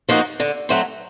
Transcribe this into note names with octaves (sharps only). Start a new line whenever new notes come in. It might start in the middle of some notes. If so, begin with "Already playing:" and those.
F3 A#3 D#4 F#4
D3
F#3 A3 C4